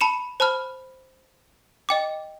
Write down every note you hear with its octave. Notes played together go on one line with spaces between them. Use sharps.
A5 B5 C#7 E7
C5 A5 B5 F6
D#5 G5 D6